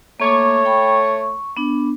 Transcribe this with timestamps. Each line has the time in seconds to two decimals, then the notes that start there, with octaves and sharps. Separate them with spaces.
0.20 A3 A#3 C#5 D6
0.65 G5 B5
1.04 C#6
1.57 B3 D4